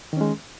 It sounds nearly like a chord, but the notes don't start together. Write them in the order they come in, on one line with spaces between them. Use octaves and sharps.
D#3 C#4 G#3